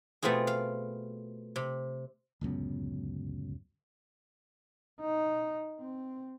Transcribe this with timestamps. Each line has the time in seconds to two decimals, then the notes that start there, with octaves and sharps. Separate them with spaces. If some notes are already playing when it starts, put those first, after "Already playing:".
0.23 B2 A3 B3 C4 F4 G#4
0.47 F5
1.56 C3
2.41 D1 C#2 F#2 B3
5.01 D#4
5.80 C4